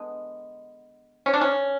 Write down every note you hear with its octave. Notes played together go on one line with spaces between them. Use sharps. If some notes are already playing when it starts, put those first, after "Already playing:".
Already playing: D3 G#3 B3
C#4
D4
C#4